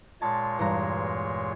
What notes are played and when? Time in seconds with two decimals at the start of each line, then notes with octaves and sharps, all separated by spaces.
0.22 A#2 G#3 C#5 A5 A6
0.59 E2 G2 A#5